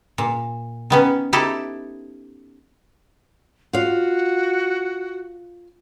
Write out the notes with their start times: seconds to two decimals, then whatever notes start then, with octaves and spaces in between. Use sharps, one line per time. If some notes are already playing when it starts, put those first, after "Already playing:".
0.18 A#2
0.90 D#3 B3 C#4
1.33 D#4 E4 G4 A4
3.73 F4 F#4 F5